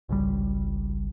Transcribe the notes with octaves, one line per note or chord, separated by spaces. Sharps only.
G#1 C#2 G3